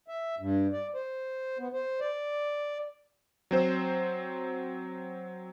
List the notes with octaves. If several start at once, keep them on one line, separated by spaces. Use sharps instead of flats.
E5
G2
D5
C5
B3
C5
D5
F#3 C4 C5